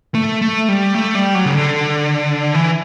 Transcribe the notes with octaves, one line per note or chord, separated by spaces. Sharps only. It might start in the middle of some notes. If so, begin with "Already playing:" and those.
A3
A3
G3
A3
G3
F#3
C#3
D3
E3